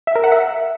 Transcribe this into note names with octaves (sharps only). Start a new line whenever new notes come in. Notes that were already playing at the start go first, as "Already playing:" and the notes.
E5
A#4
F#5
E5